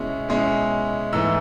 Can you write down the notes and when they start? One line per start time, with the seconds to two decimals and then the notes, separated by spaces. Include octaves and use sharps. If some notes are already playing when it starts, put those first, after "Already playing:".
Already playing: B2 G#3 C#4 E4
0.29 B2 G#3 C#4 E4
1.13 G#2 E3 A3 E6